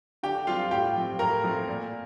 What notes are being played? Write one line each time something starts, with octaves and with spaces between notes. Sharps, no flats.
D3 G4 G5
G3 C4 F4 F5
A2 G4 G5
F3 C4
A2 A#4 A#5
F3 A3 C4
A#2